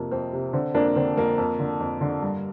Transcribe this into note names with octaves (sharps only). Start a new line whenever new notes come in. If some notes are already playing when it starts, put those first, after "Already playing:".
Already playing: F2 C3 A#3
F2 C4
C3
D3 C4
F2 A#3 D4
D3 C4
F2 A#3
F2
D3
F2
D3
G2